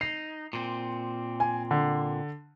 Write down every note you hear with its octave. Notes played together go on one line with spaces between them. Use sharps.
D#4 C7
A#2 C4
G#5
D3